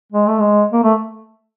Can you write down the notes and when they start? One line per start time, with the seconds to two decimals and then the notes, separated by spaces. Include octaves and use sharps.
0.12 G#3
0.27 A3
0.40 G#3
0.73 A#3
0.84 A3